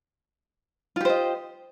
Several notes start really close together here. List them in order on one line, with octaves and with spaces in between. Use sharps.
F4 G4 C5 D#5